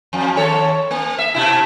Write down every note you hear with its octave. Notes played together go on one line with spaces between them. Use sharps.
F2
D#2 A4 C#5
A#3
E5
B2 E4